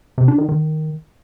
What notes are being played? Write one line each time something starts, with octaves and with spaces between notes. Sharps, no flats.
C3
D4
D#3
D#3